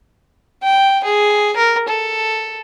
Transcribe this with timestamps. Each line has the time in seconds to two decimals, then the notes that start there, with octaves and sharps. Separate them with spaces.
0.63 G5
1.04 G#4
1.56 A#4
1.88 A4